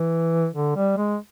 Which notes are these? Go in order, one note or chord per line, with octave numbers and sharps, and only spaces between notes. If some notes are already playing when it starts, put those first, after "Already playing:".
Already playing: E3
D3
G3
G#3